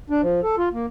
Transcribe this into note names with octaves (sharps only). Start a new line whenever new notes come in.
D4
F3
A4
F4
A#3